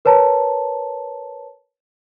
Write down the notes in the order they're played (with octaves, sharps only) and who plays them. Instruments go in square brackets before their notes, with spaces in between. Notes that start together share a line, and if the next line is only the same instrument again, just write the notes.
[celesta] A#4 B4 C#5 A5 A#5